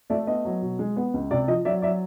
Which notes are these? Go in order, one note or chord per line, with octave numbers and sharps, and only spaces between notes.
A3 D5 E5
B3 D#5
F#3
B2
G#3
B3
C#2
C3 D5
F3 D#5
F#3 D5 E5
F#3 D5 E5